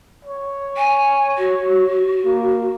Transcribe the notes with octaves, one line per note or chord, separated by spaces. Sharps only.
C#5
G#5
F#4
A#3